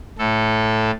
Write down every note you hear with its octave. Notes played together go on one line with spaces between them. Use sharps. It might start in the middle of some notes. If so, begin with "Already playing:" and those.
A2 A4